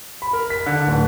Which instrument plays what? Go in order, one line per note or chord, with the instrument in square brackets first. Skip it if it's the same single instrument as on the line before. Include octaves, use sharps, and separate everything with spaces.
[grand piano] B5
A#4
B6
D3
D1